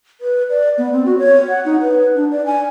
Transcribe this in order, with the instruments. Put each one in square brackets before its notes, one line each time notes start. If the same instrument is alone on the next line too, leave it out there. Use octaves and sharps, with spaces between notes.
[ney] B4
D5
B3
C4
F#4
C#5
F#5
D#4
B4
D4
D5
G#5